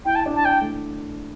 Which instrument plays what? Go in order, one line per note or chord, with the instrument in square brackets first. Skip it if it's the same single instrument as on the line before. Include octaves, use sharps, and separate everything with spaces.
[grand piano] E4 [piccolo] G5
[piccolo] A5
[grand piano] D4
[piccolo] A5
[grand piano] D4 [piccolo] G5
[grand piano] A3